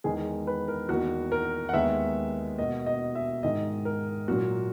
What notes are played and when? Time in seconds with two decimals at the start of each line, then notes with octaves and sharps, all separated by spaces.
0.04 E2 D#3 G#3 B3 G#4
0.47 B4
0.68 A#4
0.89 E2 D#3 A#3 F#4
1.32 A#4
1.69 F#5
1.73 D#2 D#3 G#3 B3 E5
2.58 B2 A#3 D#5
2.86 D#5
3.15 E5
3.43 G#2 D#3 G#3 D#5
3.85 A#4
4.28 A#2 F#3 A#3 F#4